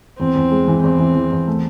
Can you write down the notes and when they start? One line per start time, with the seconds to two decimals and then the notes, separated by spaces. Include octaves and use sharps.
0.18 E2 C4
0.36 E2
0.51 G#3
0.68 E3
0.83 E2 C4
0.99 E3
1.15 E3
1.32 E2
1.47 A3